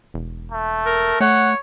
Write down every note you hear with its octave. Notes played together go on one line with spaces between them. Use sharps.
E1
A3
A#4
A3 C#5 F#5